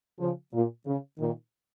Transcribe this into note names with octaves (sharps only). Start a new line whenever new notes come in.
C#3 F3
A#2
C#3
A#2 D#3